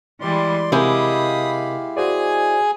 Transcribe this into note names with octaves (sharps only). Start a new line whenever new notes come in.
E3 G3 G#3 D5 C6
C3 G#3 E4 G4 A#4 F5 B5 D#6
F#4 G#4 C5 D5 G#5